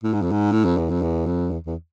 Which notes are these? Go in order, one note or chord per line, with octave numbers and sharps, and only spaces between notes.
A2
G#2
F2
G#2
A2
F2
E2
F2
E2
F2
E2
E2